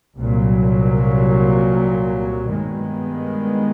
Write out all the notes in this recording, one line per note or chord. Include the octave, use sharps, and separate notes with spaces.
C2 A#2 F#3
G2 D#3 G#3 B3